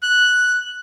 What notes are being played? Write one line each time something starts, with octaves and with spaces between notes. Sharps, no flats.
F#6